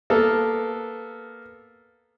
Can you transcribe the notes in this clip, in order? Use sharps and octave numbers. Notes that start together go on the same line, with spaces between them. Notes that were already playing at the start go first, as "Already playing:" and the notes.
A#3 B3 A4